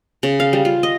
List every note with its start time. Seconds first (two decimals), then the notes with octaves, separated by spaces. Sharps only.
0.23 C#3
0.40 F5
0.53 G3
0.65 F4
0.83 D#5